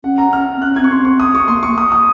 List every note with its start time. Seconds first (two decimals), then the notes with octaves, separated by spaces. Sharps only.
0.04 C#4 F#5
0.18 A#5
0.33 F6
0.57 C4
0.62 C#4 F#6
0.76 C4 G#6
0.84 C#6
0.91 C4 C6
1.05 C#6
1.20 D#6
1.35 C#6
1.48 A#3 C6
1.63 C#6
1.78 D#6
1.92 D#6